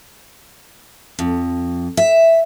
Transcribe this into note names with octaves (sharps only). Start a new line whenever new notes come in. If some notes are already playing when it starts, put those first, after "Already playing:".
F2
E5